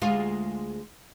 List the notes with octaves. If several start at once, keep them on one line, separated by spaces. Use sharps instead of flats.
D2 G#3 F4